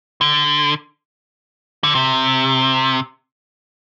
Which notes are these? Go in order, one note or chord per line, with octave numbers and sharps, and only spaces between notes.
D3
D3
C3